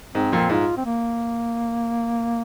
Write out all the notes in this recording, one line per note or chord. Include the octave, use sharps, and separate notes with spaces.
G#2 C4
F2 A#2
G#2 F4
C4
A#3